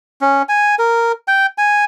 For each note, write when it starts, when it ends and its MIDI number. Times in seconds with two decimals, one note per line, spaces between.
0.21 0.42 61
0.49 0.75 80
0.79 1.12 70
1.28 1.46 79
1.58 1.85 80